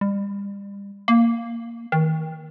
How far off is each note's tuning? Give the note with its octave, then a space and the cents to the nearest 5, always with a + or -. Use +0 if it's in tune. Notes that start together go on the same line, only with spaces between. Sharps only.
G3 +35
A#3 -5
D#3 +30